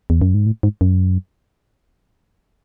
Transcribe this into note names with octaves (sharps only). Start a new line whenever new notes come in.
E2
F#2
G#2
A2
G#2
F#2